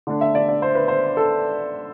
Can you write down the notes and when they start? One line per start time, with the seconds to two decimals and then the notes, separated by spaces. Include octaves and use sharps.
0.07 D3 A3 D4
0.21 E5
0.35 D5
0.49 D5
0.62 C5
0.75 B4
0.88 C5
1.17 A4